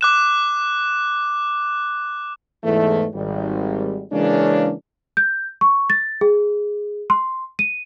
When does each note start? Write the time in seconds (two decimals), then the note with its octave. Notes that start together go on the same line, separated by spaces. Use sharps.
0.01 D6 F#6 E7
2.64 E2 G#2 E3 A3
3.15 G#1 G3
4.12 C#3 E3 G#3 A#3 C#4 D4
5.17 G6
5.61 C#6
5.90 A6
6.21 G#4
7.10 C6
7.59 D#7